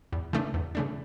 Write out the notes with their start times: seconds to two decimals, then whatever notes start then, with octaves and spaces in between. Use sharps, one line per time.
0.12 E2
0.33 C#3 E3 A3 D4
0.54 E2
0.75 C#3 E3 A3 D4